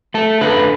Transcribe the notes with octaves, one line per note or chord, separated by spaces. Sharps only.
A3 A4
D3 B4